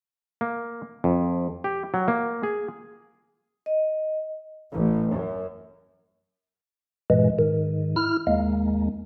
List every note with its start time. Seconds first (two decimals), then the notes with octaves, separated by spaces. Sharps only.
0.41 A#3
1.04 F2
1.64 G4
1.94 F#3
2.08 A#3
2.43 G#4
3.66 D#5
4.71 A1
5.10 F#2
7.10 G2 A#2 E3 G#3
7.39 G#2 D#3
7.96 E4 F6
8.27 D#2 G#3 A#3